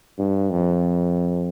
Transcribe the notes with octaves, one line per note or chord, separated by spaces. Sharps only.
G2
F2